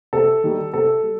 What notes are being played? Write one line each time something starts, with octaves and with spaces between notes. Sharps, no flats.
C3 A4
D#3 G3
C3 A4
G3